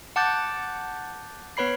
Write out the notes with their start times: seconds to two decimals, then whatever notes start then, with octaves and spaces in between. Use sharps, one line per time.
0.16 F#5 A5 D6 F#6 G6 A6
1.57 B3 B4 C#5 B5 C7